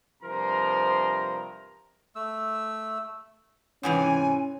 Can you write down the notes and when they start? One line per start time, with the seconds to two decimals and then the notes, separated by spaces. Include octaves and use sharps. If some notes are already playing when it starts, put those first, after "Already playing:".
0.22 G2 C3 F3 A#4 A#5 C6
2.15 A3 E6
3.83 G#2 C3 E3 C#4 G#5